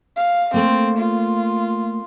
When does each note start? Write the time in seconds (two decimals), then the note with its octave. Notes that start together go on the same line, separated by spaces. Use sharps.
0.16 F5
0.54 A3 A#3 C4
0.98 F4